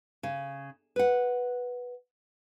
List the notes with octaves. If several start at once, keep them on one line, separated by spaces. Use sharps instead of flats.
C#3
B4 F#5